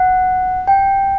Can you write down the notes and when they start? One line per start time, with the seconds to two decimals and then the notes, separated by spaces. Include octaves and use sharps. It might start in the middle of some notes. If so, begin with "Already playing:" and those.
Already playing: F#5
0.68 G5